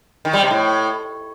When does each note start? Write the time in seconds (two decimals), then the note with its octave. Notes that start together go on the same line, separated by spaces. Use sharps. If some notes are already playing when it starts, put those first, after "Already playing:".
0.25 D#3
0.33 G3
0.42 C3
0.51 A2